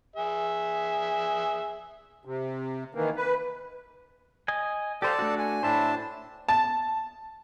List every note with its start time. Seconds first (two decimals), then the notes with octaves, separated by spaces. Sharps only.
0.16 G#4 E5
2.25 C3
2.95 D#3 E3 A#3
3.16 B4
4.48 D#5 G#5
5.02 G4 A4 C5 D5 F5 A5
5.19 A3 D4 F#4
5.39 G#5
5.63 A2 D4 C5 E5 A5
6.49 A5